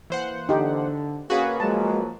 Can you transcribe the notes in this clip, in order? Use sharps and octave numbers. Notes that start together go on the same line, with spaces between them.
E3 A#3 C5 F#5
D3 D#4 G4
A#3 C#4 F#4 G#4 B4 F5
F3 F#3 G#3 A#3 A5